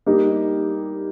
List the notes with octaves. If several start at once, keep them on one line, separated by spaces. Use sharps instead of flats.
G3 A#3 D#4 G4